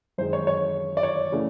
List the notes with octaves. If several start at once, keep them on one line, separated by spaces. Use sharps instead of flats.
F#2 D#3 G#3 C5
C#5
C#5
D5
C#5
C#3 E3 A3